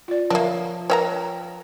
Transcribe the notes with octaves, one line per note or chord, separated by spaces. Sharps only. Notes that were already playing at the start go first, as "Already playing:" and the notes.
F4 D5
F3 A#3 D4 A#4 C#5 E5
A#4 B4 C#5 E5 G5 A#5